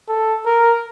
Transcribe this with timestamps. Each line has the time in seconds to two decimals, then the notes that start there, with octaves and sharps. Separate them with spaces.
0.08 A4
0.46 A#4